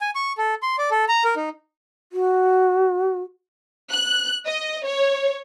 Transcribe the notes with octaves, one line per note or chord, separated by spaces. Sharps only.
G#5
C#6
A4
C6
D5
A4
A#5
A#4
D#4
F#4
F#6
D#5
C#5